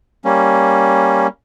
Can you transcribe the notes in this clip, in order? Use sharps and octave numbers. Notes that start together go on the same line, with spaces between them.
G3 A#3 C#4